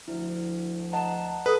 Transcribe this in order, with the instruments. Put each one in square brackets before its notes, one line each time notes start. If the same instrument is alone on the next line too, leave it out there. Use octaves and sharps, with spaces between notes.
[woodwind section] D2 F3 [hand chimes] E4
[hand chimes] D#5 F#5 A#5 [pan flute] A5
[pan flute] A4 [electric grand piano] B4 [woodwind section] D#6